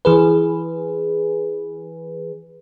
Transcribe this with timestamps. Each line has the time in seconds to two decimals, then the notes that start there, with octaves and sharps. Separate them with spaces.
0.05 E3 G#4 B4